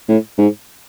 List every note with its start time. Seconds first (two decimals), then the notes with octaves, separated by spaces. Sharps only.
0.09 A2
0.38 G#2